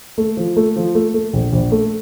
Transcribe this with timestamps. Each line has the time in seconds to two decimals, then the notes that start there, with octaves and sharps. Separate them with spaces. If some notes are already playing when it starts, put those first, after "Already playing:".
0.18 A3
0.37 F3
0.56 A3
0.76 F3
0.95 A3
1.14 A3
1.33 A#1
1.53 A#1
1.72 A3